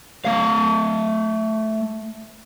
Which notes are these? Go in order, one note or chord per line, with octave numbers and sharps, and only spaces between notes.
A3 F5